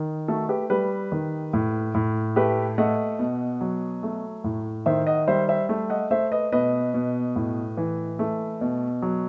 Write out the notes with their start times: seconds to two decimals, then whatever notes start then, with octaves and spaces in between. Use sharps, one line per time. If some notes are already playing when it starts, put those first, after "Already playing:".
Already playing: D#3
0.28 A3 F#4 A4
0.49 G4 B4
0.70 G3 G4 B4
1.12 D#3
1.53 A2
1.94 A2
2.36 A3 G4 B4
2.78 A3 D#5 F#5
3.19 B2
3.61 F#3
4.03 A3
4.44 A2
4.86 D#3 C5 E5
5.07 D#5 F#5
5.28 G3 C5 E5
5.49 C5 E5
5.69 A3
5.90 D#5 F#5
6.11 A3 C5 E5
6.31 B4 D#5
6.52 B2 B4 D#5
6.94 B2
7.36 A2
7.77 E3
8.19 A3
8.61 B2
9.02 F#3